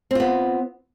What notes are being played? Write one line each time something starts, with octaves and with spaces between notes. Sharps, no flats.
B3 C4 F4